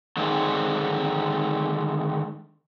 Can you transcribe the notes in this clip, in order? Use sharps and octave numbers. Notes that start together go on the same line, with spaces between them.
D3 D#3 G#3 C4